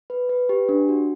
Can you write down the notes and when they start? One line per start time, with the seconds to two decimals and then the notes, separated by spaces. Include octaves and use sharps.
0.10 B4
0.29 B4
0.49 G4
0.69 D4
0.89 F#4